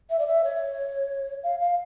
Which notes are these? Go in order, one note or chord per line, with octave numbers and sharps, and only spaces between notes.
E5
D5
E5
C#5
F5
F5